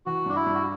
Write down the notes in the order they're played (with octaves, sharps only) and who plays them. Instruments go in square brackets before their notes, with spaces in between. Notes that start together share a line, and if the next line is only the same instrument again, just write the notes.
[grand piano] E3 [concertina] F#4
[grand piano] G2 [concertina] D4
[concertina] E4
[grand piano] G2
[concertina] F#4